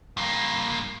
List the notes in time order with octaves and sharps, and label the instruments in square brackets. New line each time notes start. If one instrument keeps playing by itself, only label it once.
[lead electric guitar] G2 A#3